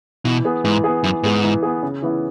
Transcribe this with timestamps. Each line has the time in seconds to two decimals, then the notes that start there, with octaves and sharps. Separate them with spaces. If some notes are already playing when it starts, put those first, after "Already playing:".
0.25 B2 E3
0.45 B3 G#4
0.64 G#2 E3
0.84 B3 G#4
1.03 F#2 E3
1.23 G#2 B3 G#4
1.44 E3
1.63 B3 G#4
1.83 C#3
2.02 E3 B3 E4